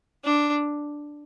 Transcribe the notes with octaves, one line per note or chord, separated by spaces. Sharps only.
D4